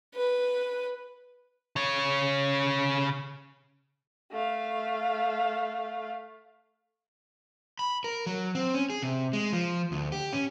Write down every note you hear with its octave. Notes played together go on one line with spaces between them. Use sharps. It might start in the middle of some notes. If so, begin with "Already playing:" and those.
B4
C#3 C#5
A3 F5
B5
A#4
F#3
C4
C#4
G#4
C3
G#3
F3
D2
G4
C#4